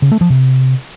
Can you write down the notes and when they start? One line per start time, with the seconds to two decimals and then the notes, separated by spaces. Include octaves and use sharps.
0.02 C#3
0.12 A3
0.21 F3
0.30 C3